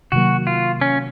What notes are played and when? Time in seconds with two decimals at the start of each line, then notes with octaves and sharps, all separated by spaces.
0.12 C3 D#3 F#3 A#3 F#4
0.47 F4
0.81 C#4